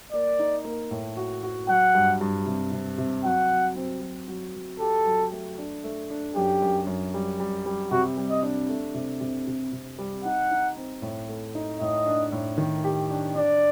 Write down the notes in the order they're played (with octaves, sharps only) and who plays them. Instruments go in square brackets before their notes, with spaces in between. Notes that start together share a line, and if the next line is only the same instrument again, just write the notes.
[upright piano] A#3 [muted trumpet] D5
[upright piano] D#4
A#3
A2
F#4
F#4
[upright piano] F#3 [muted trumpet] F#5
[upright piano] G2
G2
C3
C3
C3
[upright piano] F#3 [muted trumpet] F#5
[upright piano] F#3
C4
F#3
F#3
F#3
[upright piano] G4 [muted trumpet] A4
[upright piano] F#3
A3
D4
A3
D4
[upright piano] F#2 [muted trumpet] G4
[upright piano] F#2
F#2
G3
G3
G3
[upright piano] C3 [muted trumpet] F#4
[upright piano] G3
[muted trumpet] D#5
[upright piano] D4
A3
C3
C3
C3
C3
G3
[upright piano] D#4 [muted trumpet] F#5
[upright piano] D#4
C4
A2
A3
D#4
[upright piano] A2 [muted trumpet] D#5
[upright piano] D4
A2
D#3
G4
D4
[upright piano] D4 [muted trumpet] D5